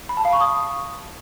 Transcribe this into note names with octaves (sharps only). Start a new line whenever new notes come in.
B5
A5
F5
C#6
D#6